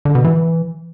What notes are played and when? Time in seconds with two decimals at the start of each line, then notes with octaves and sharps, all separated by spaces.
0.05 D3
0.15 B2
0.25 E3